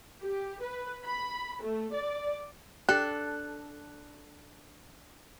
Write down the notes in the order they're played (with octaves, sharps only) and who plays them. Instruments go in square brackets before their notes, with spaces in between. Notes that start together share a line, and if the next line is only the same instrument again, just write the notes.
[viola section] G4
B4
B5
A3
D5
[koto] D4 A4 [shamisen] G4 [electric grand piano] F#6